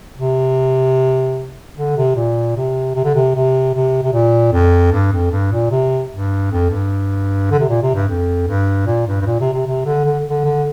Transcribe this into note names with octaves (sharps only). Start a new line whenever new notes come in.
C3
D3
C3
A#2
C3
C3
D3
C3
C3
C3
C3
A#2
F2
G2
F2
G2
A#2
C3
G2
F2
G2
D3
C3
A#2
C3
G2
F2
G2
A#2
G2
G2
A#2
C3
C3
C3
D3
D3
D3
D3